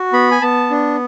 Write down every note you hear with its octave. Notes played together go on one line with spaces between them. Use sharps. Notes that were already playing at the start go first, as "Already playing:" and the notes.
Already playing: F#4
B3 B5
G#5
B3 A5
D4